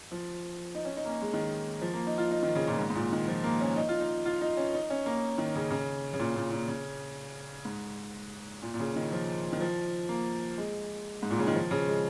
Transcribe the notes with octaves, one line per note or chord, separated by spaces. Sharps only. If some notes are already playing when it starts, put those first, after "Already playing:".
F3
D#4
C#4
D#4
A#3
C#4
G#3
D#3
F3
A#3
D#4
F4
D#4
D#3
C#3
A#2
G#2
G#2
A#2
D#3
F3
A#3
C#4
D#4
F4
D#4
F4
D#4
C#4
D#4
C#4
A#3
D#3
C#3
C#3
C#3
A#2
A#2
A#2
C#3
G#2
A#2
A#2
C#3
D#3
F3
D#3
F3
A#3
G#3
G#2
A#2
C#3
D#3
F3
C#3
G#3